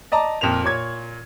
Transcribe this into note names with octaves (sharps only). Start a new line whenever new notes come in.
D5 D#5 A5 A#5
F2 A#2 A#4 E7 F7
A#2 C#5 C#6 G#6